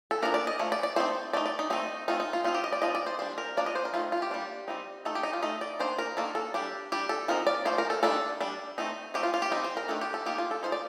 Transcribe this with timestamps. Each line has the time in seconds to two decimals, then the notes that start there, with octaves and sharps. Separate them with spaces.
0.11 A4
0.22 F3 A#3 D4 A#4
0.34 D5
0.47 D#5
0.59 F3 A3
0.72 D5
0.83 D5
0.96 A3 C4 D#4 C5
1.33 A3 D#4 D5
1.46 D5
1.59 D#4
1.70 D#3 A3 C4 D#4
2.08 A3 C4 D#4 F4
2.20 D#4
2.33 F4
2.44 F3 C4 D#4 F4
2.54 G4
2.64 D#5
2.72 D5
2.82 F3 C4 D#4 D#5
2.95 D5
3.06 C5
3.19 G3 D4 C5
3.38 A#4
3.57 F3 A#3 D4 D5
3.66 D#5
3.75 C5
3.85 A#4
3.94 D#3 A3 D#4 F4
4.12 F4
4.22 G4
4.31 G3 A#3 D4
4.68 G3 C4 D#4
5.05 D#3 A3 D#4 A4
5.15 G4
5.23 D#4
5.33 F4
5.42 A3 D#4 D#5
5.61 D5
5.79 D#3 A#3 D4 C5
5.98 A#4
6.17 D#3 A#3 D4 A4
6.35 A4
6.54 G3 D4 G4
6.92 G3 D4 G4
7.09 A4
7.28 F3 C4 D#4 A#4
7.47 D5
7.65 F3 A3 C5
7.78 A#4
7.90 A4
8.03 D#3 G3 A#3 D4 A4
8.41 G3 D4
8.78 A3 C4 D#4
9.14 F3 A3 C4 D#4 G4
9.23 F4
9.34 F4
9.42 G4
9.51 G3 C4 D#4
9.64 C5
9.77 A#4
9.88 D#3 A3 D4 A4
10.01 G4
10.14 A4
10.26 D#3 A#3 D#4 G4
10.38 F4
10.51 A4
10.63 F3 A#3 D#4 C5
10.72 D5